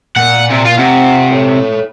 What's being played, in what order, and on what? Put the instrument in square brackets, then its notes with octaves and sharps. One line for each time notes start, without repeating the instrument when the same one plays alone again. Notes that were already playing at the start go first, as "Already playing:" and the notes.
[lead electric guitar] A#2 [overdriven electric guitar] F#5
[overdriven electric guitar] C3
F4
[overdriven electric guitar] C3 [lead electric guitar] F4 F#5
[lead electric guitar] A4 C#5